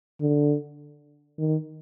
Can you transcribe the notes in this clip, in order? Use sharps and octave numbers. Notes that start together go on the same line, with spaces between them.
D3
D#3